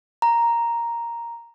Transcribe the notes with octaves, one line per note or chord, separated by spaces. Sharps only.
A#5